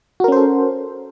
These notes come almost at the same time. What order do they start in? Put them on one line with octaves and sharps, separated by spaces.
F#4 A#4 C#4 C5 A4